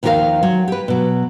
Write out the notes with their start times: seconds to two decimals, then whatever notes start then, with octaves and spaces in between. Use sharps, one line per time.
0.03 D#2 D#3 F3 G4 A#4 F5
0.43 F#3
0.68 G4 B4
0.88 B2 F#3